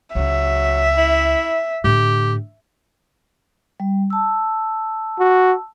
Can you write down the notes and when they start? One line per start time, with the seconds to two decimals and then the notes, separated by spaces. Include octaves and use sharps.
0.15 C#2 F#3 E5
0.97 E4
1.84 A2 D3 G4
3.80 G3
4.10 A5 E6
5.19 F#4